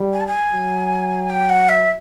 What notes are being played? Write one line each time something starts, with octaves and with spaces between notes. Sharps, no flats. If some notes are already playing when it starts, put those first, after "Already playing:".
Already playing: G3
G#5
A5
G#5
F#3
G5
F#5
E5